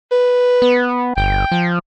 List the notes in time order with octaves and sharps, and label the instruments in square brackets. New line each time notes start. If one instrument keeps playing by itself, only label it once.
[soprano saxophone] B4
[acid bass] B3
[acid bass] G1 [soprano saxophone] G5
[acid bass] F3